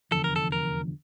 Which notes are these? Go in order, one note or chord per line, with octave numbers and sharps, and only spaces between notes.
F1 E2 D3 F3 A4
A#4
A4
A#4